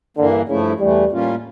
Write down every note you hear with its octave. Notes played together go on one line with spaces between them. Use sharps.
G2 D3 E3 A#3
G2 C#3 F3 A3 E4
E2 E3 G3 A3
A2 G3 A#3 C#4 F4